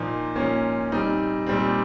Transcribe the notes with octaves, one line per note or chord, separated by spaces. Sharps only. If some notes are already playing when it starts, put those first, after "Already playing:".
Already playing: A#2 F3 A#3 D#4
A#2 F3 A#3 C#4
A#2 G3 C4 D#4
A#2 G3 C4